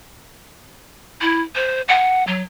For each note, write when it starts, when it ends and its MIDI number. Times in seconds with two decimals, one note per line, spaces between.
1.21 1.42 64
1.55 1.81 72
1.88 2.25 78
2.27 2.42 54